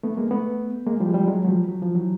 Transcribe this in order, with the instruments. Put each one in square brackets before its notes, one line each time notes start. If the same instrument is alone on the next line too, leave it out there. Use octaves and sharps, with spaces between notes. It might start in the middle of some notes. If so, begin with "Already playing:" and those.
[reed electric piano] A3 B3
G#3 A#3
A3 B3
G#3 A#3
F3 G3
G#3
F3 G3
F#3 G#3
F#3
F3 G3
F#3
F3
E3 F#3